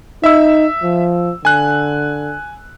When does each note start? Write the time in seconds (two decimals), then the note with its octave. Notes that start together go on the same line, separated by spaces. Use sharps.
0.24 D#4 E5 E6
0.83 F3
1.45 D3 G#5 F#6